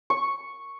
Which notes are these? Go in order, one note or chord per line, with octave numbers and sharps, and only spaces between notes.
C#6